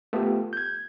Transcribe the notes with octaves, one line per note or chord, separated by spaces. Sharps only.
A3 B3 F4 G4
G6 G#6